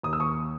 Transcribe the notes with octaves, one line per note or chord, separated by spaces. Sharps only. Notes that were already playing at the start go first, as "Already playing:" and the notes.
D#2 D#6
E6
C#6 D#6